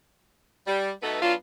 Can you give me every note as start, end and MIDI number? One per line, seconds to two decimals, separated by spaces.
0.67 0.91 55
1.03 1.22 47
1.03 1.22 57
1.03 1.22 59
1.03 1.22 63
1.03 1.22 69
1.03 1.22 71
1.22 1.33 54
1.22 1.33 59
1.22 1.33 62
1.22 1.33 65